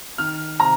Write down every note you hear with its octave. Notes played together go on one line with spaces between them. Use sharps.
D#3 F6
C3 A#5